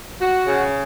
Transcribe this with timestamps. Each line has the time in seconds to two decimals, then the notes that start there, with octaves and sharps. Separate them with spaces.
0.21 F#4
0.47 C#3